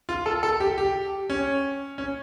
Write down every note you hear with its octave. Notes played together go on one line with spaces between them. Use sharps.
F4
A4
A4
G4
G4
C#4
C#4